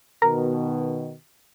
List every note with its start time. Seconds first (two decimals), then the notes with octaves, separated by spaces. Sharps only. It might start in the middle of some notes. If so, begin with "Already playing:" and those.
0.22 B2 D#3 A#4